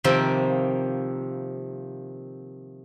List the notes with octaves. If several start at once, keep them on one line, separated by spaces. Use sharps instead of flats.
C3 D#3 F3 A#3 C4